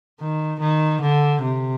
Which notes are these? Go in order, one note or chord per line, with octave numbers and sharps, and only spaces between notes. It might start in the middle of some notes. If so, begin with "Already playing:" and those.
D#3
D#3
D3
C3